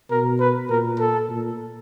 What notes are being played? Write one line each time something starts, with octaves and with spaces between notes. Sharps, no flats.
B2 A#4
B4
A#2 A#4
A4
A#2